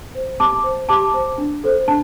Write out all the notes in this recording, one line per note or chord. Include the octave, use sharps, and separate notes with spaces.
C5
G4 A5 D6
C5
G4 A5 D6
C5
D4
A4 C5
D4 A5